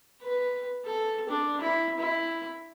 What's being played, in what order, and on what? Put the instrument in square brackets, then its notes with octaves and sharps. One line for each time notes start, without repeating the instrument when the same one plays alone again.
[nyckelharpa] B4
A4
D4
E4
E4